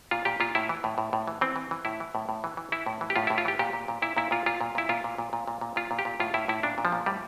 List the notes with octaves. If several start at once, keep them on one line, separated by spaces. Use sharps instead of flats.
A#2 F4
A#2 G4
A#2 F4
A2 E4
E3
A2
A2
A2
E3
E3 C4
E3
E3
A2 E4
E3
A2
A2
E3
E3
E3 E4
A2
E3
G4
A2 F4
E4
A2
F4
E3 G4
A#2 G4
A#2
A#2
A#2 E4
A#2 E4
A#2 F4
A#2 F4
A#2
A#2 E4
A#2 F4
A#2
A#2
A#2
A#2
A#2
A#2 F4
A#2
G4
A#2
A2 F4
A2 E4
A2 E4
A#2 D4
A#2
F3
A#2
A2 G3